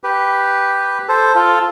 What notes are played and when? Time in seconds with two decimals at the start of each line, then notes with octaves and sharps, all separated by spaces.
0.04 G4 B4
1.08 A4 C5
1.35 F4 A4